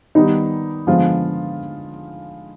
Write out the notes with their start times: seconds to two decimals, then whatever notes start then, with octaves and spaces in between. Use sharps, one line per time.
0.15 D#3 G3 B3 D#4
0.87 D3 F3 G#3 B3 F4